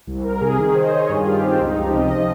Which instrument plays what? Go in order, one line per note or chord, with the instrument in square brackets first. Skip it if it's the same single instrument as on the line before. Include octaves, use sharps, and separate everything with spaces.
[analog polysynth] C2
C2 A#4
C3 G#4
D#3 G#4
D#3 C5
D#5
D#3 C#5
G2 G#4
F4
D#3 G4
G2 C4
C#2 D#4
F3 G4
C3 D#5
F3 D#5